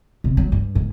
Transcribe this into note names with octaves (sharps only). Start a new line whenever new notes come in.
C3
F#3
G2
G#2